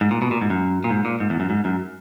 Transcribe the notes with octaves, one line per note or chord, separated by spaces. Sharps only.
G#2
A#2
B2
A#2
G#2
F#2
A#2
G#2
A#2
G#2
E2
F#2
G#2
F#2